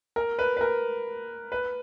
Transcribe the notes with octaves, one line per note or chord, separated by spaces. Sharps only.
A#4
B4
B4
A#4
B4